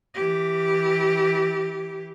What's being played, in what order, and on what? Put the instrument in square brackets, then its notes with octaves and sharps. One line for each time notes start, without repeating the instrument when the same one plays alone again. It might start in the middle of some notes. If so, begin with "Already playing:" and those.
[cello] E3 G4